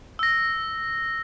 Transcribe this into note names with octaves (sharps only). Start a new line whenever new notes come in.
E6 A#6